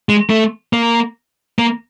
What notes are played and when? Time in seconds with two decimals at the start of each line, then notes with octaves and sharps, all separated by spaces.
0.09 G#3
0.30 A3
0.73 A#3
1.59 A#3